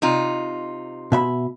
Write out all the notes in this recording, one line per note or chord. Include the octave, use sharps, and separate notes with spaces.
C3 D#4 F4
B2 E5 B5